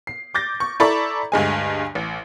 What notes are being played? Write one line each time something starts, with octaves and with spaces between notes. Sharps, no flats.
C7
D6 G6 A6 A#6
C#6
E4 A4 D5 A#5 B5 C#6
D2 G2 G#3 G#5
A1